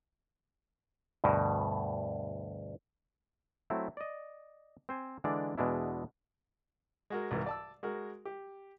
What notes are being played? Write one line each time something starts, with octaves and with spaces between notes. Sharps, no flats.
D2 G2 B2
F#3 A3 C4 E4
D5 D#5
C4 C5 G#5
D3 E3 G#3 D4 D5
E2 B2 G#3 D4 E4
G#3 F#4 A#4
C2 G#2 E3 A#4
D5 A5 E6
G#3 F#4 A#4
G4